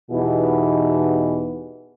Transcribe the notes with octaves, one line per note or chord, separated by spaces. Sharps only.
E2 B2 E3 D#4 E4 G4